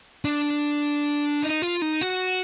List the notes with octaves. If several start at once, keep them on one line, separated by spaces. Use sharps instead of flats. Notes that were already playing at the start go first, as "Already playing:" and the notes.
D4
D#4
F4
D#4
F#4